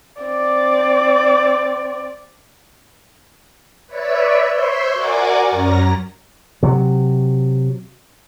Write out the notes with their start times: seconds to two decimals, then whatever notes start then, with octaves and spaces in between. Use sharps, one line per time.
0.23 C4 D5
3.87 B4 C#5 D5 E5
4.52 C5 C#5 E5 C6
4.93 F#4 A#4 D5 F#5 G#5 D6
5.50 F#2 C#4 A#5 A#6
6.63 C3 F#3